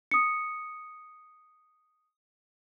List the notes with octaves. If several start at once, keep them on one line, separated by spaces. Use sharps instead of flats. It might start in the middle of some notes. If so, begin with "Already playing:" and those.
D#6 C#7